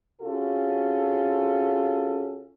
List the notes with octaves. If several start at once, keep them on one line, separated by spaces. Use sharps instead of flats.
C3 C#4 F4 F#4 G#4 A4